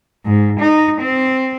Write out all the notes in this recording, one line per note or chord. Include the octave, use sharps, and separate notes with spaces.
G#2
D#4
C4